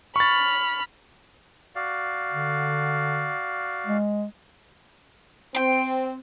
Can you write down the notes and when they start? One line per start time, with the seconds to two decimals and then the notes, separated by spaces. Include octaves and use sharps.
0.16 B5 C#6 F6 A6
1.75 F#4 D5 F5
2.31 D3
3.86 G#3
5.55 C4 G5 C6